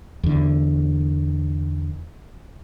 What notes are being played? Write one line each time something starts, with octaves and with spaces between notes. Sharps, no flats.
E2 D3